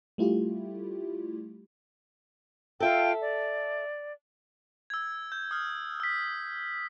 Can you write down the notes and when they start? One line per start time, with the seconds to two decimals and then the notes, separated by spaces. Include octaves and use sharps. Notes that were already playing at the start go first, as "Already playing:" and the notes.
0.18 G3 A3 E4 F4 G4
2.80 F4 A4 E5 F5 G5
3.20 D5
4.90 E6 G#6
5.32 G6
5.51 D#6 F6
6.00 E6 B6